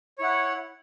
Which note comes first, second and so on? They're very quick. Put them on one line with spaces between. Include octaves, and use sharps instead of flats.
C#5 E4 F#5